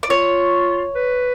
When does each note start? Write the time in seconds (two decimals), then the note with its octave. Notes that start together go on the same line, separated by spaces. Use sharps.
0.03 D5
0.09 F4 C#5
0.95 B4